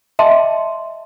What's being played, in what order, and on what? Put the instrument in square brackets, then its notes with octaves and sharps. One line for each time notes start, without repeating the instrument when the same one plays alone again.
[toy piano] D#5 E5 G5 A5 C6 D6